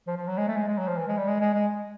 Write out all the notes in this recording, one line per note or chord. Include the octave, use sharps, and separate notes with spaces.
F3
F3
F#3
G#3
A3
G#3
G#3
F#3
F3
E3
G#3
G3
G#3
G#3
G#3